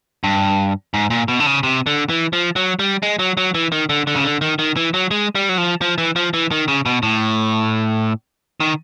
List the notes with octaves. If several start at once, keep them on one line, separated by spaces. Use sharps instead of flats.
G2
G#2
A#2
B2
D3
C#3
C3
D3
E3
F3
F#3
G3
G#3
F#3
F#3
E3
D#3
D3
D3
C#3
D3
D#3
D#3
E3
F#3
G#3
G3
F#3
F3
F3
E3
F3
E3
D#3
C#3
B2
A2
D#3